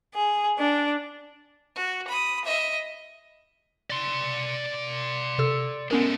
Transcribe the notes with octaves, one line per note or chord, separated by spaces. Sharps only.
G#4
D4
F#4
B5 D#6
D#5 E5
D5 C6
C3 A4 E6
G#3 A3 B3 C#4 A#4